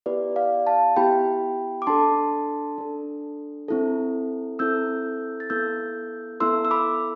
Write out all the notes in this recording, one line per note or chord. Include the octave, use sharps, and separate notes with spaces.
B3 E4 G4 B4 D5
D5 F5
F5 A5
B3 E4 G4 G5 B5
D6
D4 A4 A5 C6
D4 A4
C4 E4 A4
C4 E4 A4 E6 G6
A6
B3 E4 A4 E6 G6
B3 E4 A4 C6 E6
E6
B5 D6